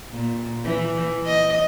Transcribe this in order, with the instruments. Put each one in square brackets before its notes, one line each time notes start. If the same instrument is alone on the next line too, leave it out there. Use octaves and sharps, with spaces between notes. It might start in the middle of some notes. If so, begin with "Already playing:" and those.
[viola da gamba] A#2
E3
D#5